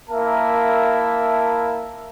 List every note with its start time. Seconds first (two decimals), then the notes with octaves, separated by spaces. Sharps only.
0.10 A#3 E4 A#4 E5 A5